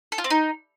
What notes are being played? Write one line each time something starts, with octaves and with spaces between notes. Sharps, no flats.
A4
F4
C4
D#4